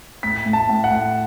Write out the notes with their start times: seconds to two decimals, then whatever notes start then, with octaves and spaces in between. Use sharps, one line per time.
0.23 A2 B6
0.46 A2
0.53 A5
0.69 A2
0.84 F#5
0.91 A2